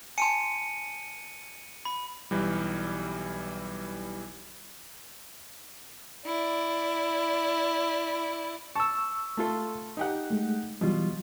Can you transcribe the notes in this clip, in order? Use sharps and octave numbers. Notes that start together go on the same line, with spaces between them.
G#5 A5 C6 C#7 D#7
B5
B1 E3 G3
E4 D5
A5 C#6 E6
A3 F4 A4
D#4 G4 F#5
G#3 A3
B2 E3 F#3 G3 F4